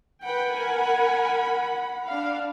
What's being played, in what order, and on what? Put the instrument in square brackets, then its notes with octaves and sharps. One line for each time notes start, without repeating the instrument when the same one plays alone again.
[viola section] B4 G5 [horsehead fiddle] F#5 B5
[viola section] A#4 G#5
D4 F5